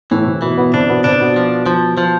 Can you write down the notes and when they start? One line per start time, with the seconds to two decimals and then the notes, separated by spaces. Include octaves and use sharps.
0.11 A2 E3 A3
0.26 C3 C4
0.42 B2 E3 B3
0.58 B2 B3
0.73 C3 C4 D4
0.89 B2 B3
1.04 C3 C4 D4
1.20 B2 B3
1.36 F3
1.66 F3
1.98 F3